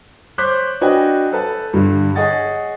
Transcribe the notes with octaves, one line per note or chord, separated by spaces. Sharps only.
C5 C#5 D6 F#6 G6 B6
D4 F#4 B4 D#5 G5 G#5
A4 B4 A5
G2 D3 G3
G#4 C#5 D#5 F#5 A6